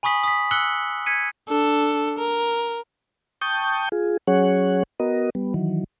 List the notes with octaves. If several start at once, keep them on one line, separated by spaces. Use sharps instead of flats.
G#5 B5 C#6 D#6 B6 F#7
D#6 B6
E6 F#6 C#7 F#7 G7
G#6 B6 C#7 D#7
D4 A4
A#4
G5 A5 C#6 D#6 G6
F4 G#4
F#3 C#4 G#4 C#5 F#5
B3 F#4 A#4 D#5
G3 B3
D#3 E3 F#3